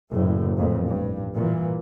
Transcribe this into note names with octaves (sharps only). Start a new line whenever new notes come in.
F#1 A2
A1 F2 A#2
G2
A#2 E3